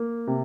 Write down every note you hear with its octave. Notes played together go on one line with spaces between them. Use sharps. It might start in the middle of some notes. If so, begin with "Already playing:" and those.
Already playing: A#3
C3